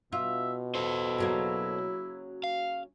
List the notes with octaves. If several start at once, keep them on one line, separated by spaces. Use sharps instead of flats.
B2 F4 E5
E4 A4 C5
C#3 F#3 A#3
F5